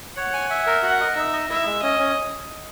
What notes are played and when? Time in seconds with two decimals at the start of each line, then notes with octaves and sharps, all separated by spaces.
0.16 C#5 F#5
0.34 G#5
0.50 E5
0.67 A#4
0.83 F#4 F#5
1.00 D#5
1.16 D#4 E5
1.33 D#5
1.50 E4 E5
1.65 G#3
1.82 C#4 D#5
1.99 C#4